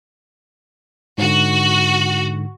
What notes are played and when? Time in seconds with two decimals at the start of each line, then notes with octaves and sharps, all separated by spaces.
1.18 G#2 D3 F#4